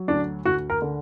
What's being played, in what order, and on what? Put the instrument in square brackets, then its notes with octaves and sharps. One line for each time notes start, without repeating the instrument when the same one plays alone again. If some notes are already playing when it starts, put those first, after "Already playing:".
Already playing: [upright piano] F#3
D2 D4
D2 F#4
A#4
D3